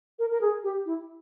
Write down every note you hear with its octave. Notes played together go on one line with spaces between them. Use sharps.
A#4
A#4
G#4
G4
E4